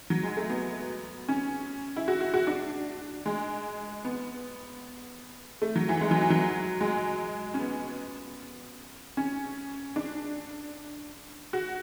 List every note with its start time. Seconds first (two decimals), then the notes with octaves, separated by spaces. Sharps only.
0.10 F#3
0.23 G#3
0.37 A3
0.50 B3
1.29 C#4
1.96 E4
2.08 F#4
2.21 F#4
2.34 F#4
2.47 D4
3.26 G#3
4.05 B3
5.62 A3
5.76 F#3
5.89 E3
6.01 G#3
6.11 F#3
6.21 E3
6.30 F#3
6.81 G#3
7.54 C#4
7.59 B3
9.17 C#4
9.96 D4
11.53 F#4